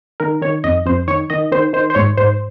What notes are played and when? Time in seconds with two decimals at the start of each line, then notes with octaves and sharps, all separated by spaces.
0.20 D#3 A#4
0.42 D#3 C#5
0.64 F2 D#5
0.86 F2 C5
1.08 D#3 C#5
1.30 D#3 D#5
1.52 D#3 C5
1.73 D#3 C5
1.90 C5
1.95 G#2 C#5
2.18 G#2 C5